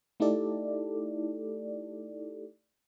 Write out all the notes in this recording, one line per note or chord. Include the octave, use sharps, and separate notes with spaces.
A3 D#4 E4 G4 A4 D5